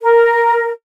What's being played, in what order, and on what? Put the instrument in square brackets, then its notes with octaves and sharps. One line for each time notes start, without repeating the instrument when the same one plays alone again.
[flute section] A#4